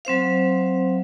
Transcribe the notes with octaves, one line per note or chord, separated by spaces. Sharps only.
F#3 C4 C5 F5